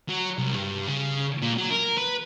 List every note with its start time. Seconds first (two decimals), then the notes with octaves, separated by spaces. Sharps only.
0.09 F#3
0.38 C2
0.55 G2
0.88 C#3
1.42 A#2
1.57 F#3
1.70 A#4
1.98 B4